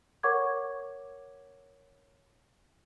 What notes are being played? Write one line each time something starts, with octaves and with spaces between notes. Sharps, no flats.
A#4 C#5 F#5 C#6 D6 G#6